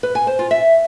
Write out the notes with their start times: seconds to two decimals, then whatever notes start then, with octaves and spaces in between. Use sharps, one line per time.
0.03 B4
0.15 G#5
0.27 C5
0.39 F4
0.51 E5